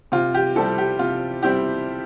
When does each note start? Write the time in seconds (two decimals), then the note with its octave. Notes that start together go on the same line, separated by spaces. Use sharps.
0.12 C3 F4
0.34 G4
0.55 G3 C4 E4 A4
0.78 G4
0.99 C3 F4
1.43 G3 C4 E4 G4